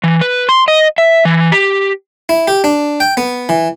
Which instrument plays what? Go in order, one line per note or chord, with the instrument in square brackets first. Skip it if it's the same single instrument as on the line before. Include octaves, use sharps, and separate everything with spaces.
[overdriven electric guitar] E3
B4
C6
D#5
E5
E3
G4
[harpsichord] E4
G4
D4
G5
B3
E3